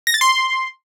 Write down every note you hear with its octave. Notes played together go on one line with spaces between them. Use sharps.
A#6
A6
C6